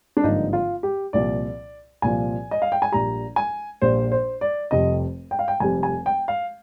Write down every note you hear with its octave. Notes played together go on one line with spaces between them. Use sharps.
D4
G#1 G2 D3 F3 A#3 D#4
F4
G4
C2 A#2 F3 D5
C2 A#2 F3 G#5
D#5
F5
G5
G#5
A#1 A#2 G3 A#5
G#5
A#1 A#2 G3 C5
C5
D5
F1 F2 C3 G3 D#5
G5
F5
G5
F1 F2 C3 G3 G#5
G#5
G5
F5